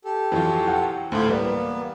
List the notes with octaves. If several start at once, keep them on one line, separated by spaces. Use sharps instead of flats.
G4 A4
F2 E3 F#3 F4 C#6
F#5 G5
D2 A2 A3 E4 F4 C5 B5
G3 A#3 B3 B4 D5